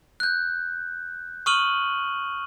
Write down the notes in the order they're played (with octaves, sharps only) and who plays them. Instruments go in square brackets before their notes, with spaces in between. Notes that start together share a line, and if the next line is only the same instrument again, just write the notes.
[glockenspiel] F#6 G6
C#6 D#6 F6 D#7 F#7 G7